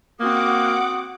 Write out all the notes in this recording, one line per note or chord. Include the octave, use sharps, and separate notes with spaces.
A#3 C4 F#4 F#5 D6 D#6